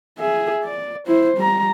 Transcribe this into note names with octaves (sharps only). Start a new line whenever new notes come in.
G#4 E5
D5
E4 C5
G3 A#5